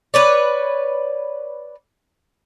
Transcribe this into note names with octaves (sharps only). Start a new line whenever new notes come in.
B4 C#5 D5